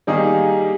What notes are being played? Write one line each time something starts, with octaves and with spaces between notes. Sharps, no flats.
D#3 G3 A#3 D#4 G#4